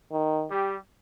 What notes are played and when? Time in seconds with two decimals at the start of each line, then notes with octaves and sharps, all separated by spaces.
0.12 D#3
0.50 G3 G4